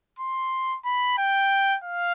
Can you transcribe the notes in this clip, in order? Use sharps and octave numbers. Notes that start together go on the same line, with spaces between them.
C6
B5
G5
F5